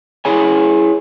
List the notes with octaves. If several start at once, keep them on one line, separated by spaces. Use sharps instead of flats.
E4 G#4 C#5 G#5